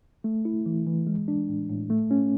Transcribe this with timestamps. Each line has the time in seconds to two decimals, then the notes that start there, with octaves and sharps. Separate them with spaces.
0.24 A3
0.45 E4
0.66 E3
0.86 E3
1.07 G#3
1.28 D4
1.49 A2
1.70 A2
1.90 A3
2.11 C#4